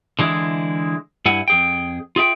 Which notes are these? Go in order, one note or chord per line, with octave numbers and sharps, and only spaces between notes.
D3 E3 G#3 E4
G2 E4 F#5 G#5
F2 G#4 G5
F4 G#4 E5 G5